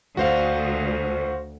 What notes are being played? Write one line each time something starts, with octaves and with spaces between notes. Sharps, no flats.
D2 F#4 C5 F5